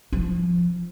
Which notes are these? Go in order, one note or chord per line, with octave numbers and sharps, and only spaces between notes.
F3